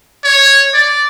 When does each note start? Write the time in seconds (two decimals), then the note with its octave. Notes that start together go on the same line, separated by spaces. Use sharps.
0.24 C#5
0.74 D5